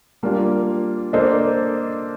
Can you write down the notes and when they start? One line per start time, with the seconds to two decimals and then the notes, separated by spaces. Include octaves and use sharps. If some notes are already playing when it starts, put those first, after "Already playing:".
0.23 G3 A#3 D4 F4
1.13 A#3 D4 A4 C5 D#5